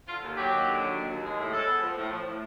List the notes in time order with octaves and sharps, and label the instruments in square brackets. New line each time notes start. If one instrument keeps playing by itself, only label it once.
[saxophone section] D3 F4
D#2
F#3 G4
D#2
D3
F#3
D#2
D#2
G#3
A2
G#3 A4
B3
F3
A2
F3
A2